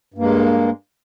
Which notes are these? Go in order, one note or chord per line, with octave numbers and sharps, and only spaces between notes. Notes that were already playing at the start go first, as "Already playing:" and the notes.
G2 G#3 A#3